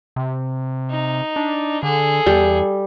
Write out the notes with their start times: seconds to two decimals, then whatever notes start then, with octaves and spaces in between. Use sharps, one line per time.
0.16 C3
0.91 D#4
1.36 D4
1.83 D3 G#4 A4
2.26 E2 G3